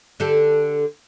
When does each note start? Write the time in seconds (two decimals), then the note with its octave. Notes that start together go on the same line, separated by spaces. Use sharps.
0.20 D3 G4 A4